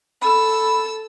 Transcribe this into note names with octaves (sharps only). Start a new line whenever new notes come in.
A4 B5 E6